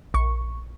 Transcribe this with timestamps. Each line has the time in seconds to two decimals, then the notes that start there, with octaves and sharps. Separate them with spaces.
0.14 A#1 C#6